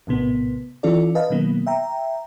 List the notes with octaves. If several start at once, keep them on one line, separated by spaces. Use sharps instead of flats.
A#1 A2 C3 B3
E3 C#4 F4 A4 D5
B4 D#5 F5 A5
B2 D#3 F#3 A#3 B3
E5 G5 A#5